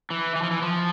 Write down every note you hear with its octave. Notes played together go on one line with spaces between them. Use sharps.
E3
E3
F3
E3
F3